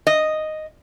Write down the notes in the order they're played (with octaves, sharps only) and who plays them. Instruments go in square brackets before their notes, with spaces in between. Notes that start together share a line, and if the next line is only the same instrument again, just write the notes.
[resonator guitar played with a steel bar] D#5